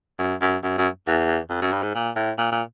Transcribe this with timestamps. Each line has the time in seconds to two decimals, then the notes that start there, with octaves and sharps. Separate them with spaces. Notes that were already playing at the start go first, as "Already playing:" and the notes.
0.19 F#2
0.41 F#2
0.63 F#2
0.78 F#2
1.07 E2
1.50 F2
1.62 F#2
1.73 G2
1.83 G#2
1.94 A#2
2.16 A2
2.38 A#2
2.52 A#2